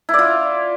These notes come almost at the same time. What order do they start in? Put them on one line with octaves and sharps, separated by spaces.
E4 D5 F4